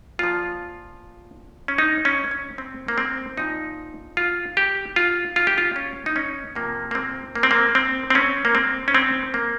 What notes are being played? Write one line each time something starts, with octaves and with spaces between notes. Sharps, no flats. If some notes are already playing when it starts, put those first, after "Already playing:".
A#2 F3 F4
C#4
D#4
C#4
C#4
C4
A#3
C4
A#2 F3 D#4
F4
G4
F4
F4
G4
F4
C#4
D#4
C#4
C3 F3 A#3
A#3
C4
A#3
C4
A#3
C4
C4
C#4
A#3
C4
C#4
C4
A#3